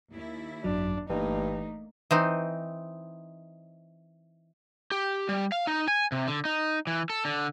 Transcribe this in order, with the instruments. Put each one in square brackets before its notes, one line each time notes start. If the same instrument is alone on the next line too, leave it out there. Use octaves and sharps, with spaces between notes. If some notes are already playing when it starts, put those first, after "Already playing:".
[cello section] D#2 E4
[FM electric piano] G#1 F#2 F#3 [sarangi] D4
[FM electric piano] G1 E3 [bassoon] G2 [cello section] A3 A#3 [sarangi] D#4
[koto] E3 C4 D#4
[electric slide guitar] G4
G3
F5
D#4
G#5
C3
D3
D#4
E3
A4
D3